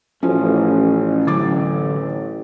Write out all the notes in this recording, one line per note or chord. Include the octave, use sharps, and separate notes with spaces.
A1 F3 C#4 F4 F#4
D3 E3 F#3 D6 A6